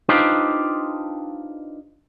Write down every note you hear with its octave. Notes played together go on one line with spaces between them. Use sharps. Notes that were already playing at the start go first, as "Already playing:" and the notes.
D4 D#4 F4 G4 B4 C5